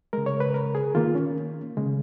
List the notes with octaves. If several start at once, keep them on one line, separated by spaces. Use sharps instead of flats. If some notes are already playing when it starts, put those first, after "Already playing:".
C#3 G#3 A#4
C#5
B4
A#4
G#4
D#3 A#3 F4
C#4
C#3 G#3